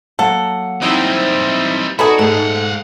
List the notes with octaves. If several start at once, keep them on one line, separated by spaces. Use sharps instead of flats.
F#3 A#3 A4 F#5
E3 G3 C4 D#4 E4
B3 D#4 F#4 G#4 A4 D5
G#2 A3 F5 F#5